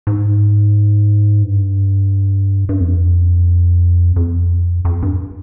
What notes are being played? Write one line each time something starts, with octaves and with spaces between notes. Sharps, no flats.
G#2
G2
G2
F2
F2
F2
G2